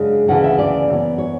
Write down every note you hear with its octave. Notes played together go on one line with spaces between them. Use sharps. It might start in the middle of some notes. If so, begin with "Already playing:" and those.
Already playing: F#2 C#3 G#3 D4
D2 C#3 E3 A3 F#5
E5
D5
F#2 E3 B3
C#5